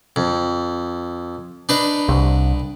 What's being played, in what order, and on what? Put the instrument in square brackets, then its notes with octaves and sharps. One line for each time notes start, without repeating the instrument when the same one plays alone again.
[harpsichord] F2
D4 D#4 B4
[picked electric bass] C2